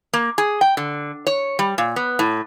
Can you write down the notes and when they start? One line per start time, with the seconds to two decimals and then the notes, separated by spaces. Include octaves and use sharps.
0.13 A#3
0.38 G#4
0.61 G5
0.77 D3
1.27 C#5
1.59 G3
1.78 A#2
1.96 B3
2.19 A2